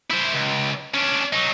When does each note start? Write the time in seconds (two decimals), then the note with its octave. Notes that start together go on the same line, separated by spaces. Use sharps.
0.11 E4 C5
0.34 C#2
0.94 C#4 D4
1.33 F#3 D#4